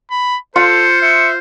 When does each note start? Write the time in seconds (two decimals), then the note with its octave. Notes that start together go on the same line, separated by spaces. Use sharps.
0.11 B5
0.56 F4 A4 C5 C#7
1.02 E5 C#7